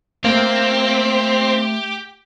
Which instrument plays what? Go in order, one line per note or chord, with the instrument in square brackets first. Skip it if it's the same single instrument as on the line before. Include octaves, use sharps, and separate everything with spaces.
[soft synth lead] A3 [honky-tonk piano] A#3 [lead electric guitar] C4 [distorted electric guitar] G4